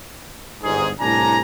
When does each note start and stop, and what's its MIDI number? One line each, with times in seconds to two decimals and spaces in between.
0.62 0.89 31
0.62 0.89 44
0.62 0.89 68
1.00 1.40 36
1.00 1.40 45
1.00 1.40 62
1.00 1.40 80
1.00 1.40 82